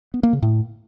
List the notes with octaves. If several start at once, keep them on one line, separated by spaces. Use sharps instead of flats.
B3
A#3
C#3
A2